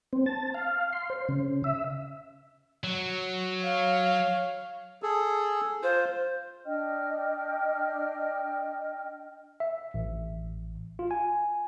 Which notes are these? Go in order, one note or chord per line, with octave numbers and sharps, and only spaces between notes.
C4
A5
F5
C6
C5
C#3
E5
F#3
C#5 F5
G#4 A4
F4 C5
D4 D#5 G5 F6
E5
A1
F4
G#5